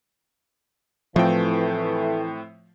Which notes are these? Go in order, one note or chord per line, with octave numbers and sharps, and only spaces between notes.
A2 E3 F3 A3 C4 G5